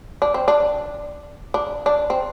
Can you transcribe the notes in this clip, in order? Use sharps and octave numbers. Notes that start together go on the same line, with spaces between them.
D4
C4
D4
D4
D4
C4